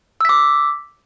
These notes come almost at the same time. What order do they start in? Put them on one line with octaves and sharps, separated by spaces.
E6 B6 D6